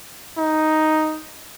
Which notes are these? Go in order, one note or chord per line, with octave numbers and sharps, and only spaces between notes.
D#4